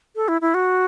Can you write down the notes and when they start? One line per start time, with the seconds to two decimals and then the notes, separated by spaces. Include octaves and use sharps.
0.16 A4
0.28 E4
0.41 E4
0.54 F#4